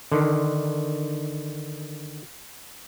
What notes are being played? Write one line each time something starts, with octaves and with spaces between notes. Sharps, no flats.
D3 D#3